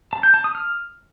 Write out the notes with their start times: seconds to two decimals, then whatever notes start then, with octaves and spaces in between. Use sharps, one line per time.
0.13 A5
0.23 G6
0.34 A5
0.44 D#6
0.55 F6